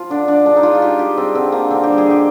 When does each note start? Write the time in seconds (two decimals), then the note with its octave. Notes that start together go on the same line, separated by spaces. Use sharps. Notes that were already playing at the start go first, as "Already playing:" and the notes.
Already playing: F3 F4
0.10 D3 D4
0.28 D3 D4
0.45 G#3 D4
0.57 D#4
0.63 G#3 F4
0.75 F4
0.81 G#3 G4
0.99 G#3 G4
1.17 G3 C4
1.35 D3 C4
1.52 D3 A#3
1.70 D3 C4
1.84 G3 G4
1.98 G#4
2.06 D3 G4